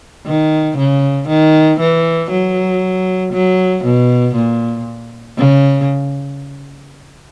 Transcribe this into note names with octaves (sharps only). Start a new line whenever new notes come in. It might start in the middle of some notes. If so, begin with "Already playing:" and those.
D#3
C#3
D#3
E3
F#3
F#3
B2
A#2
C#3